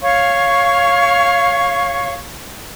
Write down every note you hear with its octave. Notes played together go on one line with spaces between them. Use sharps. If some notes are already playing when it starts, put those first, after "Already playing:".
C#5 F5 C#6